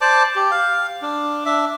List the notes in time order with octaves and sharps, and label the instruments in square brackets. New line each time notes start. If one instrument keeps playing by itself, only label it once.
[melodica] C5 D5 A5 D6
G4
F5
D4
D4 E5